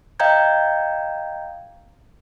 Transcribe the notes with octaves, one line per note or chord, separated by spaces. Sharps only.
D#5 F5 G5 A#5 G6 G#6